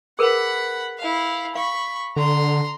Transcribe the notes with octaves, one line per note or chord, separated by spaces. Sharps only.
G#4 A#4 B4 F#5 B5
E4 F5
F5 B5 C#6
D3 A#5 C6